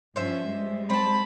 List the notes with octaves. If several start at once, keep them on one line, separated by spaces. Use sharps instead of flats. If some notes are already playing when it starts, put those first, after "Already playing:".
G2 F3 C#4 C5 E5
G3 G#3
C4 A5 B5